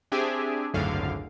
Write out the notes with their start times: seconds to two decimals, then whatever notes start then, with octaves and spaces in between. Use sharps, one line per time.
0.12 C4 D4 G4 G#4 E5 G#5
0.74 G#1 C#2 F#2 A2 D3 F5